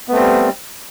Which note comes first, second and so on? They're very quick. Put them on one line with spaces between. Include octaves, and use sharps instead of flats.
B3 A3 C4 G3